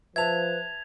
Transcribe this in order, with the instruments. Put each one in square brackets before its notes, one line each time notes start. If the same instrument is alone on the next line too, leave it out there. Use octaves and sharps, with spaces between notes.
[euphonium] F3 [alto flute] B4 [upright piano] E5 A5 [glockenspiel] G#6 F7